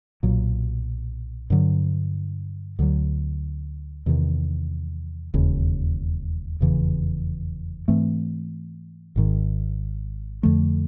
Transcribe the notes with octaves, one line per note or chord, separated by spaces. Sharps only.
B1 A#2 F#3
G2 D3 F#3
D2 D3 F#3
E2 C3 D#3
E1 D#2 C#3
F1 E2 C#3 E3
G#2 E3 A3 C4
G#1 G#2 D#3
F2 D3 F3 A3